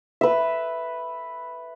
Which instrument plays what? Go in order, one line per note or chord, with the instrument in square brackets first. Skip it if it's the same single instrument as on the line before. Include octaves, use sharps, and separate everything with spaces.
[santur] B4 E5